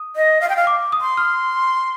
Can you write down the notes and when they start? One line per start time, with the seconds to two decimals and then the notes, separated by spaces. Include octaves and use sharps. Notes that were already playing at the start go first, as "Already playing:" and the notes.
Already playing: D#6
0.16 D#5
0.41 F5
0.49 G5
0.56 F5
0.67 D6
0.92 D#6
1.01 C6
1.17 F6